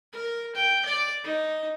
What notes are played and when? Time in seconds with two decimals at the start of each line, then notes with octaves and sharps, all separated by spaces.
0.13 A#4
0.56 G5
0.86 D5
1.24 D#4